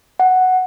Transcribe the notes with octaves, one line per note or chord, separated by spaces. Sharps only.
F#5